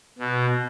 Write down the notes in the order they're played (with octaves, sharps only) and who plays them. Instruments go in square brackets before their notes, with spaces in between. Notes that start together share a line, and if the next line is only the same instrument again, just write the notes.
[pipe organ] B2